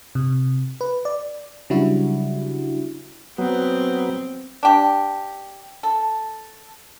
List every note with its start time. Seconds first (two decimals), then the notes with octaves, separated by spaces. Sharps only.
0.15 C3
0.81 B4
1.05 D5
1.70 C#3 F#3 G3 D4 E4 F#4
3.38 F#3 B3 C4
4.63 D4 G4
5.83 A4